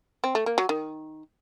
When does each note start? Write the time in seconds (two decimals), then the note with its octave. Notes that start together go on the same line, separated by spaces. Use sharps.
0.24 C4
0.35 A3
0.46 A#3
0.58 F#3
0.69 D#3